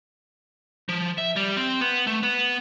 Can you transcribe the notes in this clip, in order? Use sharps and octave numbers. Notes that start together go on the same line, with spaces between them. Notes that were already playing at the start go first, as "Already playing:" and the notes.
F3
E5
G3
C4
B3
A3
B3